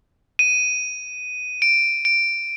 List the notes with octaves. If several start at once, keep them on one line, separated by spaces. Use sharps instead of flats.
D#7
D7
D7